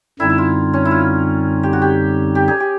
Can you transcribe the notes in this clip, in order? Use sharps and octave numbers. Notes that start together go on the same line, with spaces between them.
F#2 D3 G3 C4 D#4 E4
E4
F4
C#4
E4
F4
G4
F#4
G4
G4
G#4
G4